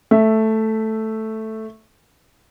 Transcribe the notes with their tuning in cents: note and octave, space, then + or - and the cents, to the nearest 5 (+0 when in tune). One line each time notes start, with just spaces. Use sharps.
A3 +0 E5 +0